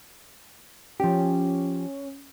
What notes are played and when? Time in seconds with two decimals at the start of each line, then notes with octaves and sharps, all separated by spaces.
1.00 F3 C#4 G4